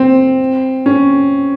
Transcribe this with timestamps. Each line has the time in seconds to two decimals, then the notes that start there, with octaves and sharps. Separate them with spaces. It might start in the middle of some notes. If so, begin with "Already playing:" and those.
Already playing: C4
0.86 C#4